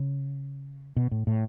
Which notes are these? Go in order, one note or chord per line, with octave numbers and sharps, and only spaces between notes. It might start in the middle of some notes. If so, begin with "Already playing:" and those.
Already playing: C#3
B2
A2
A2